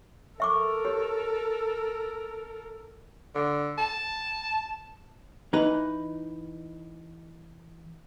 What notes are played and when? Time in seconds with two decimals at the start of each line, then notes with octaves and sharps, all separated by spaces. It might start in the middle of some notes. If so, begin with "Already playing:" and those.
0.40 A4 A#4 E5 C#6 D6
0.85 G4 C#5
3.35 D3
3.78 A5
5.53 E3 D#4 B4